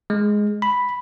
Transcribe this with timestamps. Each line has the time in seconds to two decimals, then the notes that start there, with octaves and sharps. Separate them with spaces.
0.10 G#3
0.62 B5